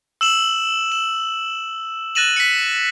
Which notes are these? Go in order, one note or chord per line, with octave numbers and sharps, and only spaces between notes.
E6 E7 F#7
E7
F#6 A6 A#6 D#7 E7 F#7
B6 C#7